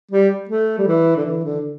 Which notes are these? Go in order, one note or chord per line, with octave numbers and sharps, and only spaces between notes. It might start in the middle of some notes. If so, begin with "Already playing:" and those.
G3
A3
G3
E3
D3
E3
D3